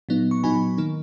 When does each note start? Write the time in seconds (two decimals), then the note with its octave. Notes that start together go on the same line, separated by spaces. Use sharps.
0.09 A#2 F#3 B3 D#4
0.31 C#6
0.44 A#2 F#3 B3 D#4 G#5 B5
0.78 D#3 A#3 D#4